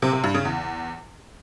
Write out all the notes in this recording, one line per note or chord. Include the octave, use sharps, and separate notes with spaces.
C3
C3
G2
C#3
E2